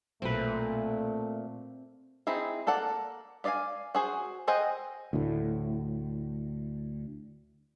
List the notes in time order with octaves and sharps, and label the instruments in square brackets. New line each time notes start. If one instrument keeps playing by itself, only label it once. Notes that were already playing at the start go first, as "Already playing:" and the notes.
[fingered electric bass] B1 [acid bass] A#2 [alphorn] A3 [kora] C4 B4
[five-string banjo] C4 D#4 E4 G#4
A#3 A4 D5 F#5
B3 D5 D#5 F5 G#5
F#4 G#4 C5
G#4 C5 D#5 F#5 G5
[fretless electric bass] D2 A2